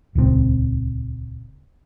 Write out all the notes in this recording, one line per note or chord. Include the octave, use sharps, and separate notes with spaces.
D#1 C#2 D#3 C4